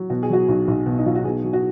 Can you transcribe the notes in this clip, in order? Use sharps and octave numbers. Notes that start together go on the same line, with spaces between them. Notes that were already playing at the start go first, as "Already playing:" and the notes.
Already playing: F#3
B2 F#4
G#4
F#3 F#4
B1
B1
B2
D#4
F#3 F4
F#4
B2 G#4
F#3
F#4